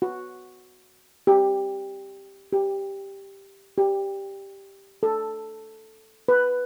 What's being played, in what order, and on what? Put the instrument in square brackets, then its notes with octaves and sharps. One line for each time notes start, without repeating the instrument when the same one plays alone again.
[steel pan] F#4
G4
G4
G4
A4
B4